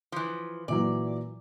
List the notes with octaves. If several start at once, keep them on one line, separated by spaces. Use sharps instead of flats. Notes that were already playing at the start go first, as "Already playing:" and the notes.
E3 F3
A#2 E3 F#3 D5